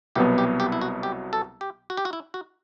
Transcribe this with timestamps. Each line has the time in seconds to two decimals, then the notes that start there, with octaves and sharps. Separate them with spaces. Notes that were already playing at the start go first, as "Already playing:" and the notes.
0.15 C2 B2 F#3 B3 G4
0.38 G4
0.60 G4
0.72 E4
0.81 F#4
1.03 G4
1.33 A4
1.61 G4
1.90 F#4
1.97 G4
2.05 F#4
2.13 E4
2.34 F#4